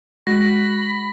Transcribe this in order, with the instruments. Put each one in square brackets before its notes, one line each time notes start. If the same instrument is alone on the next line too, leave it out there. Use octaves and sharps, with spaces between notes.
[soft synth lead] G#3 [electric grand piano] F#4 [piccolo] B5 [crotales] A#6